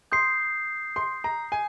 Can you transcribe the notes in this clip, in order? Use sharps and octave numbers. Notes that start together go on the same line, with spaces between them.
C6 D#6 G6 C7
C6
A#5
G#5